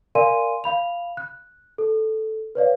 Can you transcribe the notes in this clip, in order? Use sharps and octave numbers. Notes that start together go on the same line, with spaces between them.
A#4 D5 F5 G#5 C6 D#7
F5 B5 F7
F#6
A4
B4 C#5 D5 F5